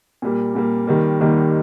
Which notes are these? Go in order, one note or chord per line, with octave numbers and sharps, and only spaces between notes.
A#2 G3 A#3
A#2 G3 A#3
D#2 D#3 G3 A#3
D#2 D#3 G3 A#3